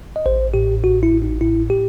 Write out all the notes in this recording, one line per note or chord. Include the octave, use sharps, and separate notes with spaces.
D#5
A1 C5
A2 G4
A1 F#4
E4
A1
D#4
A2 E4
G4